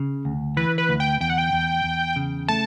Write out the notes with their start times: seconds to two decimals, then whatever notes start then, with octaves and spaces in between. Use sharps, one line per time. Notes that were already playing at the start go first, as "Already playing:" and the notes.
Already playing: C#3
0.25 D2
0.57 E3 B4
0.78 B4
0.89 D2
1.00 G5
1.21 E2 G5
1.30 F#5
1.38 G5
1.53 E2
1.84 E2
2.16 C#3
2.48 A3 A5